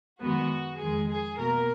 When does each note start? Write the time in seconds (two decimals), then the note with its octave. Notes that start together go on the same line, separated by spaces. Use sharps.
0.20 F#2 D#3 G#3 B3 F#4
0.78 F2 D#3 G#3 G#4
1.08 G#4
1.37 B2 A#3 A#4